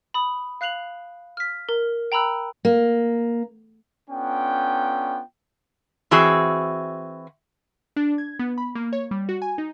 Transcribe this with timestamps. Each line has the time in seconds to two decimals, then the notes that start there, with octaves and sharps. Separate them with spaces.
0.14 B5 D#6
0.61 F5 F#6 C7 F7 F#7
1.37 F6 B6
1.69 A#4
2.12 G5 A#5 B5 E6 F#6
2.65 A#3
4.10 B3 C#4 D4 F4 A4 G5
6.11 E3 C4 F#4 G#4 E5
7.96 D4
8.18 G#6
8.39 B3
8.58 B5
8.75 A#3
8.93 C#5
9.11 G3
9.29 F#4
9.42 G#5
9.58 D#4